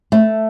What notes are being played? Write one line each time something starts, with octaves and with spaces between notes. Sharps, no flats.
A3